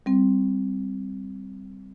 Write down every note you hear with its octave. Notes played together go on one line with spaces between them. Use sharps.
G3 C4